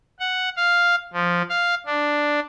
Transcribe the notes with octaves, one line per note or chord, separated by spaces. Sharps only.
F#5
F5
F3
F5
D4